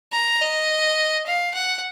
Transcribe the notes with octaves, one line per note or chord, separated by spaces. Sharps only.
A#5
D#5
F5
F#5